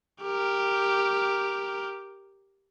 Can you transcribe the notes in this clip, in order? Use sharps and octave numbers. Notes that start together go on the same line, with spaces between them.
G4 A#4